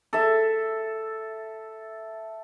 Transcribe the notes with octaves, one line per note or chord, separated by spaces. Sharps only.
A4 E5